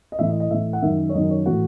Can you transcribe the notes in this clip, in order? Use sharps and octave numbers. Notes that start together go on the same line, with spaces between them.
D#5
A2 E3 E5
D#5
D#5
A2 E3 E5
F#5
F#2 D#3 E5
C#5
F#2 D#3 D#5
C#5
A2 E3 F#4